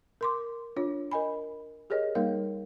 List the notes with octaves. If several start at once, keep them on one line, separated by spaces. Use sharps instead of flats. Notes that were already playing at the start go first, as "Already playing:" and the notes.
A#4 C6 D6
D4 F4 C#5
A#4 D#5 G#5 B5
G4 G#4 A#4 C#5 D#5
G3 A#3 D#4 A#4 C#5 F5